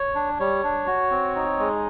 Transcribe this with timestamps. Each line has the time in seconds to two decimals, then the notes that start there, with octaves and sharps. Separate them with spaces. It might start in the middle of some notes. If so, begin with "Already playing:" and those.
Already playing: C#5
0.15 D4
0.39 G3 C#5
0.63 D4
0.87 F#4
1.11 C4
1.35 D#4
1.59 G#3